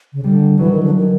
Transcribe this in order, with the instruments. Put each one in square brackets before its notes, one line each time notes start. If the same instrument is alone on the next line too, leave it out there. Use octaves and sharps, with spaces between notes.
[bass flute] C#3
[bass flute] D3 [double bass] G3
[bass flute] E3 [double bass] F#3
[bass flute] D#3
D3
D#3